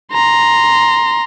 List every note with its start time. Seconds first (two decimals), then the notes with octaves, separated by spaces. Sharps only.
0.12 A#5 C6